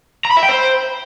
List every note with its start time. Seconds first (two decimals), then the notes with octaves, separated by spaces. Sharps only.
0.25 A#5
0.31 B5
0.37 E5
0.43 G5
0.49 C5